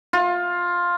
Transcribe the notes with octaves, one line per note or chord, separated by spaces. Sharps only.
F4